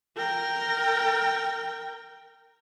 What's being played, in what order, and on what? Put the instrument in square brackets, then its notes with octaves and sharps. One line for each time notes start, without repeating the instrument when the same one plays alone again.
[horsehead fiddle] A#4 G5